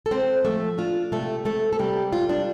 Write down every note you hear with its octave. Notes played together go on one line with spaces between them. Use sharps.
A4
C3 C4 C5
F3 A3 A4
D4 F4
C3 A3 A4
A3 C4 A4
A4
C3 G3 G4
G3 F4
D4